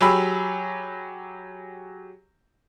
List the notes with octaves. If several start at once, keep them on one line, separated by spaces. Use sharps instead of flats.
F#3 G4 G#4 B5 E6